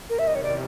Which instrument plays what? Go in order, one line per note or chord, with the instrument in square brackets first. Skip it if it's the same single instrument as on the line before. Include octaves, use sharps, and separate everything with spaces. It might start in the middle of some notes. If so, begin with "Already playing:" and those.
[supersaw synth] E2 C3 D#3 G3 [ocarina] A#4
[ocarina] E5
D#5
C#5
D5